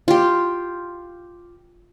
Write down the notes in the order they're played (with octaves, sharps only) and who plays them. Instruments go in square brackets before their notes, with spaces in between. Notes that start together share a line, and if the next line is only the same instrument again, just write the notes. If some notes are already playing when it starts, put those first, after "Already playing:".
[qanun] F4 G4